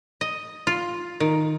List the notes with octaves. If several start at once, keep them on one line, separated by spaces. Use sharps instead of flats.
D#5
F4
D#3